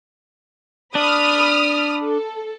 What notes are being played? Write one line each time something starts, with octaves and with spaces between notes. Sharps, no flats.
D4 B5 D#6 F6
A4